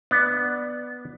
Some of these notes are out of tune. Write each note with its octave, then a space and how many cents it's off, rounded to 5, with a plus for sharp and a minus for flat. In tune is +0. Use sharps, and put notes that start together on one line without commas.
B3 +0 D4 +15